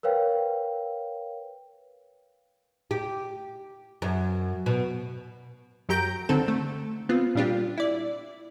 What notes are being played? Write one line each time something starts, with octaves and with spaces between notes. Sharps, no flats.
A#4 B4 C#5 F5 G5
G4
F#2
B2
F#2 F#3 G4 A#5 G6 D7
D3 D#3 C4 A4
A3
B3 C4 F4
A#2 G3 D4 F4 G4
E4 D5